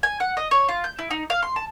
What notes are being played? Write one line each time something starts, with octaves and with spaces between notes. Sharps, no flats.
G#5
F#5
D#5
C#5
F4
G6
E4
D#4
F5
C6
A5